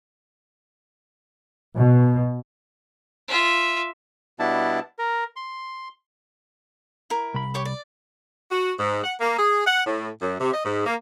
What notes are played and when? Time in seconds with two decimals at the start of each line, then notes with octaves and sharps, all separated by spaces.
1.78 B2
3.28 F4 E5
4.39 B2 G3 B3 D4 E4 A5
4.99 A#4
5.36 C6
7.10 E4 A#4
7.34 C2 B5
7.54 G4 C#5 D6
7.65 D5
8.51 F#4
8.79 G#2
9.04 F#5
9.20 A#3
9.38 G#4
9.67 F#5
9.87 A2
10.21 F#2
10.41 C3
10.54 D#5
10.65 G#2
10.86 A#3